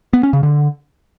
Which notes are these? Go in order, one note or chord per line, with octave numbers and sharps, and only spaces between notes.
B3
C#4
C#3
D3